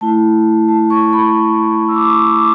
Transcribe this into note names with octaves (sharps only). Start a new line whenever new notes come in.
A3 E4 A5
A5
C#6
B5
E6
D6
C#6
D6